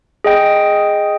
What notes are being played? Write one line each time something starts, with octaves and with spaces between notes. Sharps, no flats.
G#4 D#5 G5